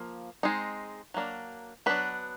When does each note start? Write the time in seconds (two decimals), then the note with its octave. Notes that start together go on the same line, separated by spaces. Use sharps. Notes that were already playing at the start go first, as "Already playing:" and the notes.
Already playing: F3 A#3
0.43 G#3 C4 D#4
1.14 F#3 A#3 D4
1.86 F#3 B3 D4 B4